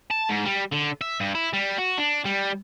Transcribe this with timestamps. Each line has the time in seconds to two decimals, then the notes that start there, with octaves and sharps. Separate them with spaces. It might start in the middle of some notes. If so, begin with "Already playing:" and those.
0.10 A5
0.29 G#2
0.47 G3
0.73 D3
1.01 E5
1.20 G2
1.35 E4
1.53 G3
1.78 F#4
1.98 D4
2.25 G3